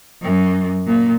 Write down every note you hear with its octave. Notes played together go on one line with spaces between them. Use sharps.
F#2
A#2